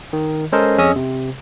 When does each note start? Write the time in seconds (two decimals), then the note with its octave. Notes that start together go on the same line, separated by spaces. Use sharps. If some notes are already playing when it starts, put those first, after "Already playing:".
0.13 D#3
0.52 G#3 C#4 A4 A#4 C5 D#5
0.78 F2 C#4 G#4 D#5 D#6 E6
0.96 C3